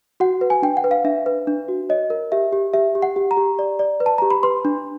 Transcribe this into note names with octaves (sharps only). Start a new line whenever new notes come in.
F#4 F#5
B4
G#5
D4 G5
F#5
B4
F5
D4 E5
B4
D4
F#4
C#5 D#5
A#4
G4 E5
G4
G4 E5
G4
F#5
G4
A#5
G4
D5
D5
B4
A5
G4 A#5
B5
B4 C6
D4